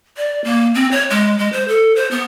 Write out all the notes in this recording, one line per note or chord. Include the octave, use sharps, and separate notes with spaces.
D5
A#3
C4
C#5
G#3
G#3
C5
A4
C5
B3